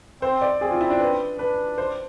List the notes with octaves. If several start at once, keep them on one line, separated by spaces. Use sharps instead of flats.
C4 C5
D5
C4 G#4
F4
E4
D4
B4
D4 B4
C5